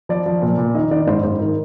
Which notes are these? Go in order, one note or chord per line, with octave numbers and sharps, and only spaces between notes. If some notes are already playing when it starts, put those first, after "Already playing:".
F3 D5
F3
A#2
A#2
D#3 D#5
D#3 D5
G#2 C5
G#2 C5
D#3 A#4